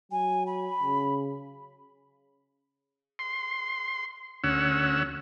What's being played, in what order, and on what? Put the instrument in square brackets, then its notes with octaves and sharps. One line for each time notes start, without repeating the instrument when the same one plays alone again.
[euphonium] F#3 [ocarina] G#5
[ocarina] B5
[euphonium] C#3
[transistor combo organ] C6
D2 C#4 F#5 E6